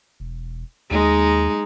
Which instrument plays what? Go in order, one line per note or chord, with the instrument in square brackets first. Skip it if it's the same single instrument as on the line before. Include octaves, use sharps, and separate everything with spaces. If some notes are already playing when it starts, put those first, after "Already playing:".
[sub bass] E1
[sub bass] D#2 [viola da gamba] G#3 D#4